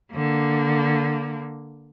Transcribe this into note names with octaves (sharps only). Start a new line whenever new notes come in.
D3 A#3